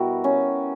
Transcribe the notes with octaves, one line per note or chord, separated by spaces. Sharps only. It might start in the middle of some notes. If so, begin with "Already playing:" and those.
Already playing: B2 G3 E4 F#4 A#4
C#4